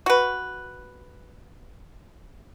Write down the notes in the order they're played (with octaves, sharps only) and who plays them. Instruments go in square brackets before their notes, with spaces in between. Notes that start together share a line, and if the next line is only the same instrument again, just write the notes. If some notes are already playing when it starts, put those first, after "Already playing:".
[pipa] F#4 B4